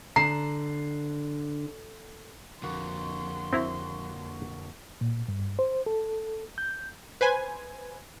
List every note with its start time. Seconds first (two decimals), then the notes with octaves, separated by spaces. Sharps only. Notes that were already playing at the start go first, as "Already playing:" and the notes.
0.16 D3 A#5 C7
2.63 F2 D3 A#3 F#4 C6
3.53 C4 E4 F#4 A#5
5.01 A#2
5.28 G2
5.59 C5
5.86 A4
6.58 G6
7.21 B4 C5 G#5